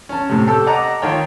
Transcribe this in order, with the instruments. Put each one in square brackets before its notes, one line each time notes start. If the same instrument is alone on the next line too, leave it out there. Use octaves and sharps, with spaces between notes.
[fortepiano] C#4 A5
A2 C3
G4 A4 A5 E6
D#5 F#5 A5 A#5 D6
D#3 F4 C#5 G5